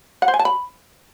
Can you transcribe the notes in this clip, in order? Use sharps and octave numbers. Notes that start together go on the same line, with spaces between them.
F#5
C5
G#5
A5
B5